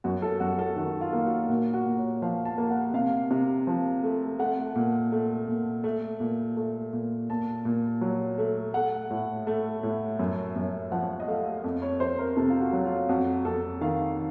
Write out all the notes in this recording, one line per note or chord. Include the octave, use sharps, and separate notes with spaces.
F#2 F#4
A4
F#2 F#4
A4
D#3 F#4
F4
A#3
F#4
A#2 F#4
F#4
A#2
C#5
F3 F5
A5
A#3
F#5
C3 F5
C3
F3
A3
A3 F#5
A#2
A3
A#2
A3
A#2
A3
A#2
A#2 A5
A#2
F#3
A3
A3 F#5
A2
A3
A2
F#2
F#2
F3 F#5
D#5
A3 F5
F2
C#5
F2 C5
A#4
C3 A4
F4
F#4
F#3
F4
F2 F#4
F2 A4
D#3 F5